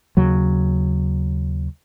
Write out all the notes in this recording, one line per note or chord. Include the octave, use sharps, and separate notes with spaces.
D#2 C#3 F#3